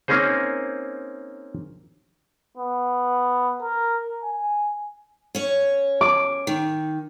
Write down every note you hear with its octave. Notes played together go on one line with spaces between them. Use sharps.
A#3 C4 C#4 D#4 G#4 C5
B3
A#4
G#5
C#4 C#5
D6
D#3